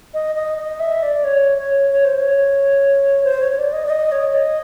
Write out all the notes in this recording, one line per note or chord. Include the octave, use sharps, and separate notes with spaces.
D#5
D#5
D#5
E5
D5
C#5
C#5
C#5
C5
C#5
C5
C#5
C#5
D5
D#5
D5
D#5
C#5
D#5